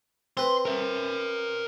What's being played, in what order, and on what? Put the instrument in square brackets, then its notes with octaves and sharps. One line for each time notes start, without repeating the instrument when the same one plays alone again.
[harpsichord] C4 B4 [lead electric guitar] C6
[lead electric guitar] A#4 E5